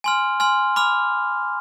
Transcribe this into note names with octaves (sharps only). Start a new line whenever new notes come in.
G#5 C6 F6
G#5 C6 F6
B5 D6 F6